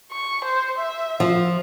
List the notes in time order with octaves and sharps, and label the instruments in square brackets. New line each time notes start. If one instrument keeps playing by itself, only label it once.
[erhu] C#6
C5
E5
[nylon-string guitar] F3